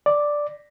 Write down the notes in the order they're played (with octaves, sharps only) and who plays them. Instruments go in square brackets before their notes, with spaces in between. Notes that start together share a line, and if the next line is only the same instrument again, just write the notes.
[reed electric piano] D5